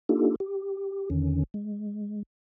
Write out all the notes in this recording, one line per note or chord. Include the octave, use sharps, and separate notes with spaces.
A#3 D4 D#4 F4 G4 A4
G4
E2 D3 D#3 C#4
G#3